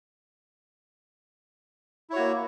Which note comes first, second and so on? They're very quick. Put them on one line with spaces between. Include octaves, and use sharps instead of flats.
E4 C#5 F#4 A#3